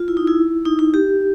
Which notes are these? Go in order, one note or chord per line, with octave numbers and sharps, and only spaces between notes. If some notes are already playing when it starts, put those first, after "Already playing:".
Already playing: F4
E4
D#4
E4
D#4
D#4
G4